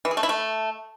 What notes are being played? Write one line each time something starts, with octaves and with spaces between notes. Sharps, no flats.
E3
G#4
A3
E4
A3